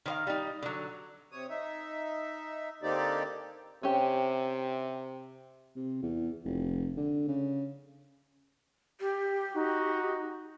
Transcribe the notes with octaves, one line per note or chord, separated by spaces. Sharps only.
D#3 C5 F5
G3 D#4
D3 F#3
C3 C#5 D#6
D#4 E5
D3 A#3 C4 D#4 G4 D5
C3 C#4 G4
C3
E2
F1
D3
C#3
G4
D#4 F#4